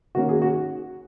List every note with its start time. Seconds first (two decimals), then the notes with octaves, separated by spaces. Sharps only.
0.15 D#3 A#3 C#4 F#4
0.29 G#4
0.42 F#4